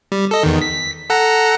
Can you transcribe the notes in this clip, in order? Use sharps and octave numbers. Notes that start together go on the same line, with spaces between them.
G3
A4 D#5
E2 D#3
B6
A4 F#5 A#5